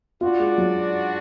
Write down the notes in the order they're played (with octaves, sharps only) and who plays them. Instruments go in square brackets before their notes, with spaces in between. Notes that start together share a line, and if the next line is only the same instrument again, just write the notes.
[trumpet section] D4 F#4 D5 [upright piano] F4
[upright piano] G#3
F#3